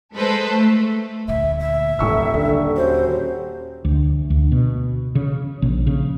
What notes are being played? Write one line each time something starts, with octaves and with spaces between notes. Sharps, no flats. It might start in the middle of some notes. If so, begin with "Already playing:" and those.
G#3 A4 B4 C5
A3
D2 A#2 E5
E5
D#1 D#2 G#2 C#6 E6
D#2 D3
C#4 F#4 G4 C5
D2
D2
B2
C#3
A#1
C#3